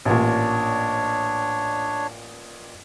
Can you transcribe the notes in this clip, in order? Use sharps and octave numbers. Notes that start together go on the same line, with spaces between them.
A1 A#2 D4 C#5